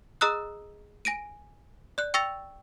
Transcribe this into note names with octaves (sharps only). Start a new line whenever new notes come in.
G#4 D#5 A#5 D#6 E6 F#6
G#5 A#6 D7 D#7
D5 F#6
G5 C#6 E6 A6 A#6 F7